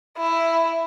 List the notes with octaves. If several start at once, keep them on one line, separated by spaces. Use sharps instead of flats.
E4